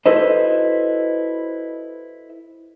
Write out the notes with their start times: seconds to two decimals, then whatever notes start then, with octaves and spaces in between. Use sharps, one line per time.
0.06 E4 F#4 A4 B4 C5 D#5